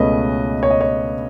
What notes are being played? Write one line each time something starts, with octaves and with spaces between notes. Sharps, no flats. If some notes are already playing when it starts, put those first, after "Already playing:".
Already playing: C#2 B2 A3 C#4 B4 D#5
C#5
D#5
C#5